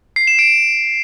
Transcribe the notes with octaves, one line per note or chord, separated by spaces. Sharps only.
C7
E7
D7